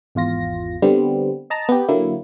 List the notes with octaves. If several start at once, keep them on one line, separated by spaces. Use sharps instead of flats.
G#1 E2 F4 A#6
D3 G3 B3 C4
D#5 A5 A#5
B3 G4
D3 F#3 A#3 E4